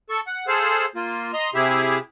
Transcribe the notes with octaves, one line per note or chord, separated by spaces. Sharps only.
A4 C#6
F#5
G#4 A4 C5 F5
A#3 F4
D#5 A#5 C6
C3 E4 G4 G#4 E5